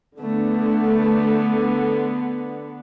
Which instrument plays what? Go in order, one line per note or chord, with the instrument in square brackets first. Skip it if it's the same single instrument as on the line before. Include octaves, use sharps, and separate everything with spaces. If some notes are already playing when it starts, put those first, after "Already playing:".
[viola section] D3 B3 [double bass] A3